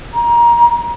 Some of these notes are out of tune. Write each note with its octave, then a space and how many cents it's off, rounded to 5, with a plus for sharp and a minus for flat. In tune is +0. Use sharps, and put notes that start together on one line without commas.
A#5 +25